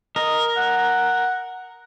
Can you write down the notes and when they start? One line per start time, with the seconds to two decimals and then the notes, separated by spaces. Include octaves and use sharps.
0.16 A#4 D#5
0.57 F#5